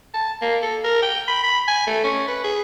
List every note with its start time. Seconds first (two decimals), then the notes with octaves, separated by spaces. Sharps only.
0.14 A5
0.42 A#3
0.62 A4
0.84 A#4
1.02 G5
1.28 B5
1.44 B5
1.68 G#5
1.87 A3
2.04 C#4
2.28 B4
2.44 G#4